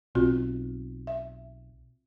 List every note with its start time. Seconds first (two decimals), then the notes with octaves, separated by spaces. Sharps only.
0.15 B1 C4 F4 F#4
1.07 E5